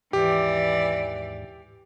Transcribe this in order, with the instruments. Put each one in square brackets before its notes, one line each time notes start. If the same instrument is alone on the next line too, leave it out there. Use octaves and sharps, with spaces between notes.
[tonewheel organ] D#2 G#2 [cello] E3 D5 [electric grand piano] G4